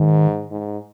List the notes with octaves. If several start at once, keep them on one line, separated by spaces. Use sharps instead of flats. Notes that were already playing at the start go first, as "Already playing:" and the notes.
Already playing: G#2 D#3
G#2